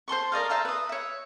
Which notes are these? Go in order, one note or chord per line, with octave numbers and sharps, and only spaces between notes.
C5 A5 C6 C#6
A#4 D5 D#5 F5
C5 E5 A5 A#5
B4 D#6
C#5 E5